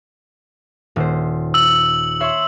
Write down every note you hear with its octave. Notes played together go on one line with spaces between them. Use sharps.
D#1 C5
E6 F#7
C#5 E5 C6